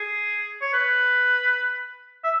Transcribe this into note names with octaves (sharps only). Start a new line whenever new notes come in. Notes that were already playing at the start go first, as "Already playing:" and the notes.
Already playing: G#4
C#5
B4
E5